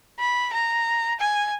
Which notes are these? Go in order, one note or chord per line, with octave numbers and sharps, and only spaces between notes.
B5
A#5
G#5